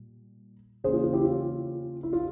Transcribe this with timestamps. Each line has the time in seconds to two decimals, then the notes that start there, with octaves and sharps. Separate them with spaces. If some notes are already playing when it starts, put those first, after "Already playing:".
Already playing: A#2 G3
0.84 E2 C#3 E3 A#3 C#4 G#4 C5
0.93 F4
1.04 F4
1.13 E4 G4
1.24 F4
2.03 E4
2.13 F4